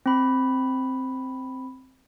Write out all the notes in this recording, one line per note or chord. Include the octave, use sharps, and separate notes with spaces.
C4 B5